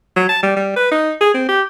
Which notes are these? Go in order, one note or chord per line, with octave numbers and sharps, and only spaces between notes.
F#3
A5
G3
G3
B4
D#4
G#4
C4
G4